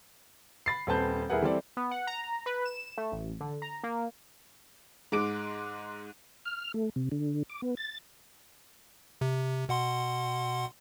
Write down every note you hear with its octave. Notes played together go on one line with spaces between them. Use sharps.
B5 A6 C7
D#1 C4 B4 A5 G6
D#1 E4 G#4 A#4 B4 F#5
E3 G3 C4 A4 D5
B3
F#5
A#5
A#5
B4
E7
A3
A1
D3
A#5
A#3
G#2 G#3 D6 D7
F6
A3
C3
D3
D6
B3
A6
C3
B2 F#5 C6